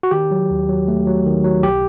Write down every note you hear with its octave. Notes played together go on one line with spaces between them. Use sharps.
F#4
D#3 G4
F#3
D#2
F#3
A3
F#3
D#3
F#3
B1 G4